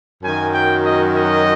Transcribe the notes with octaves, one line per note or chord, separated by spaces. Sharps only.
F#2 D#3 F#3 G#5
G5
D#5
D#5